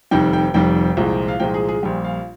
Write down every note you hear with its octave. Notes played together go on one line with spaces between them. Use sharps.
F1 F2 D#3 G3 G5
G5
F1 F2 D#3 G3 G5
C2 A#2 F3 G#3
F5
C2 A#2 F3 G#3 G5
G#4
G#4
A#1 A#2 G3 G4
F5